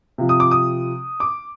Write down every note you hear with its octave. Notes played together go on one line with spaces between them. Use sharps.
C3 F3
D#6
D6
D#6
D6